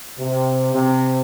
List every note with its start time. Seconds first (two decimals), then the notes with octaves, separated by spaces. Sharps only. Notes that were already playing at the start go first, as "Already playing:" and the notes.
0.18 C3
0.73 C3